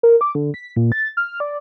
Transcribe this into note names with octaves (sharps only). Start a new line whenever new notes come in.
A#4
D6
D3
B6
A#2
A6
F6
D5